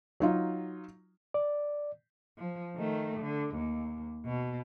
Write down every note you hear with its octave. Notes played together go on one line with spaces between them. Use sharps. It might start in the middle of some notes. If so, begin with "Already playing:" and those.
F#3 D#4 F4
D5
F3
D#3 A3
D3
D#2
B2